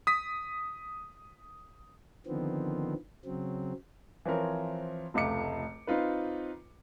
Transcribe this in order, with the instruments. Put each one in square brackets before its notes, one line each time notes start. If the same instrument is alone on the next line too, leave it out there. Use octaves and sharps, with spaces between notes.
[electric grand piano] D#6 B6
[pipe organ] D3 D#3 F3 B3 C4
C#3 F#3 C4
[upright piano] E3 F3 C4 A#4 C#5
F1 C#2 A3 D6 C#7
C4 D#4 F4 B4